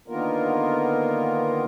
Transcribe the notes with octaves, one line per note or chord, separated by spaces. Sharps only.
D3 D#3 A#3 B3 F4 A#4